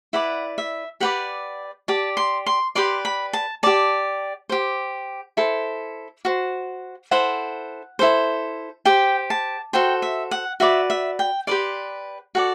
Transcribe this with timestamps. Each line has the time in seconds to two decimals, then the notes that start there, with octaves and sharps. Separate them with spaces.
0.13 E4 B4 D5 F#5
0.58 E5
1.00 G4 B4 D5 F#5
1.88 G4 D5 A5
2.17 C6
2.46 C6
2.75 G4 B4 D5 C6
3.05 B5
3.33 A5
3.63 G4 D5 A5
4.49 G4 C5
5.37 E4 A4 C5
6.25 F#4 C5
7.11 E4 A4 C5 F#5
7.99 E4 A4 C5
8.85 G4 C5 G5
9.30 A5
9.73 F#4 A4 C5 G5
10.02 E5
10.31 F#5
10.60 F#4 B4 D5 E5
10.90 E5
11.19 G5
11.47 G4 B4 D5 C6
12.35 F#4 A4 D5 F#5